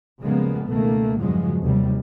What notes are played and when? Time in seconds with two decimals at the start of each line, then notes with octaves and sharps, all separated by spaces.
0.21 C#3 F3 G3 G#3 A#3 B3
0.69 C#2 B2 D#3 A3 A#3
1.20 E2 G2 C#3 F3 F#3 G#3
1.62 D#2 C3 F#3 G3